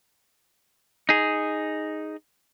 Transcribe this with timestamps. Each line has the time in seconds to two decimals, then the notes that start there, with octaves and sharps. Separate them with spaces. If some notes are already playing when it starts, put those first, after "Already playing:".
1.09 D#4 G#4